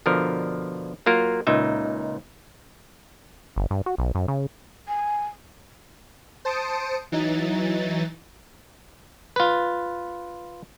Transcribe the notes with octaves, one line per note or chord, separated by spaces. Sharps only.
B2 D3 F3 A#4
F#3 A#3 F4 A#4
C#2 A#2 D#4 E5
G1
G2
F#4
B1
F#2
C#3
G#5
C5 A5 D#6 C#7 D7
E3 F#3 D#4 A6
F4 B4